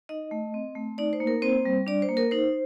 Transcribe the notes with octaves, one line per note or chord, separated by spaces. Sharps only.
D#4 D#5
A3
C4
A3
D#4 D5
C5
A#3
A#4
C4 C5
G3
D4 D5
C5
A#3
A#4
D#4 C5